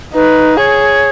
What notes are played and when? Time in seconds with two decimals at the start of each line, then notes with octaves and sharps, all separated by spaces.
0.14 D#4 B4
0.57 G#4 C#5